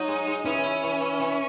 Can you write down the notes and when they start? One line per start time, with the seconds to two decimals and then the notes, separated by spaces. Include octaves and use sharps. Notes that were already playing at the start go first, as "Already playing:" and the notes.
Already playing: F#3 D#4
0.08 G#3
0.27 G#3
0.45 E3 C#4
0.64 E4
0.83 E3
1.01 E3
1.19 E3